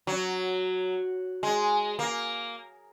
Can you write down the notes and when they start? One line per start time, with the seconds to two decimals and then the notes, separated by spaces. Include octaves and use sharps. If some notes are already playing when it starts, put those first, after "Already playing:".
0.07 F#3
1.43 G#3
1.99 A#3